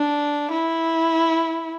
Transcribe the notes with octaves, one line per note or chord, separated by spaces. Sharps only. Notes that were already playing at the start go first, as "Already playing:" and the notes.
Already playing: D4
E4